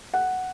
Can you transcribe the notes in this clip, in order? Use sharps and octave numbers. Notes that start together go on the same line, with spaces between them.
F#5